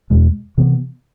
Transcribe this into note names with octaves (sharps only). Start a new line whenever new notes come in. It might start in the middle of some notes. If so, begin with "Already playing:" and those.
E2 B2 G#3
C3 E3 B3